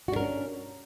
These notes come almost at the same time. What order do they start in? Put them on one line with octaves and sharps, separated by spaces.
F#4 D4 A#4 C#4